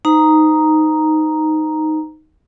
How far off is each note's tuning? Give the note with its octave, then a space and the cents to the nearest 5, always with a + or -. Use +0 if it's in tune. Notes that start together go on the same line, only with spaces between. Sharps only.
D#4 +0 C5 -25 A#5 +0